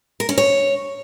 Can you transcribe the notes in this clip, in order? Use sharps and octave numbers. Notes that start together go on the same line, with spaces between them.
A#4
C#4
C#5